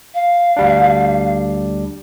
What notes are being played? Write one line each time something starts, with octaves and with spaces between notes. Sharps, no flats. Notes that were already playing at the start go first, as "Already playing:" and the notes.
F5
D2 G3 D4